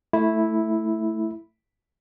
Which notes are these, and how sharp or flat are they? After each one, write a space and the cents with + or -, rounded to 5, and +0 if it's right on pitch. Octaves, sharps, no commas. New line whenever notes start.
A3 +0 E4 -5